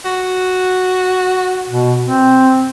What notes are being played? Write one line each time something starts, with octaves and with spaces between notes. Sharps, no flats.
F#4
B2
C4